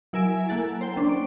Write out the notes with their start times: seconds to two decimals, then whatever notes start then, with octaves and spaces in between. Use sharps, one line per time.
0.13 F#3 E4 A#4 E5 G#5 D7
0.49 A#3 A4 F#5 A6
0.81 C5 G5
0.96 A#3 C#4 D4 C6
1.09 D7